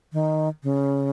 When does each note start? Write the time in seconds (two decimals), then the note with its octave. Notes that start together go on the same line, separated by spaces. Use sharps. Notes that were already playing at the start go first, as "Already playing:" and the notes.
0.13 D#3
0.63 C#3